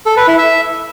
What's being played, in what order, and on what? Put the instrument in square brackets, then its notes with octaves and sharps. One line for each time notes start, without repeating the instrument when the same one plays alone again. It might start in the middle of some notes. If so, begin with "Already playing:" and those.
[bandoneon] A4
B4
E4
E5